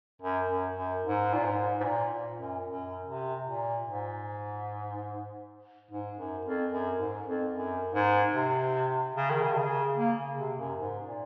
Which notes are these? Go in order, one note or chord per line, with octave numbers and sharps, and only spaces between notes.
F#2
F#2
F#2
G#2
A#2
G#2
G#2
A#2
A#2
F#2
F#2
C3
A#2
G#2
G#2
F#2
F2
F#2
G#2
F2
F#2
G#2
C3
C#3
D#3
C#3
C3
C#3
A#3
C#3
C3
F#2
G#2
A#2